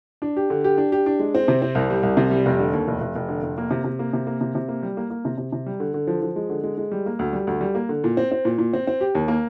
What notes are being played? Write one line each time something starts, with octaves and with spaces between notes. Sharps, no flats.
D4
G4
D3
G4
D4
G4
D4
G#3
C4
C3
C4
C2
G3
C2
C3
G3
F1
D3
D#2
F1
F1
F1
D3
F1
A#3
C3
C3
A#3
C3
A#3
C3
C3
A#3
G3
A#3
A#3
C3
C3
C3
G3
D3
D3
F3
F3
G#3
D3
G#3
G#3
G3
A#3
D2
G3
D2
G3
A#3
D3
A#2
C4
C4
A#2
A#2
C4
C4
G4
D#2
A#3